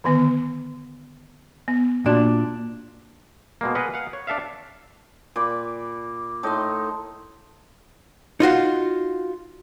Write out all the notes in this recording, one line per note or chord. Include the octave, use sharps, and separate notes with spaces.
D3 D#3 B3
B3
A#2 D4 F#4
B2 G#3 A#3
G#4 A#4 B4 D#5 F#5
F5 F#5
C#5
D4 A4 E5 F5
A#2 B5 D6
A2 D#4 A5 C6
D#4 F4 F#4 F5